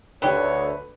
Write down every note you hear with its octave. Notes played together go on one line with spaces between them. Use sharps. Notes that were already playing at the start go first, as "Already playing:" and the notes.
D2 D3 D#4 G4 B4 C#5